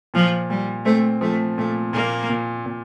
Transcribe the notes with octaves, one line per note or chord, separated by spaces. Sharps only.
A#2 F3
A#2 G3
A3 C4
F3 A3
A#2 A3
A#2 A#3
A#2
A#2